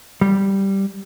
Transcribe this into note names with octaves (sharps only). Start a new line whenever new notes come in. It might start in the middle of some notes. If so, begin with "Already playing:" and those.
G3